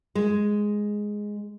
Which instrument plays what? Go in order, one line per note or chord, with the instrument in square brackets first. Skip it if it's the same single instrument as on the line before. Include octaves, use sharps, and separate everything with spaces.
[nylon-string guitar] G#3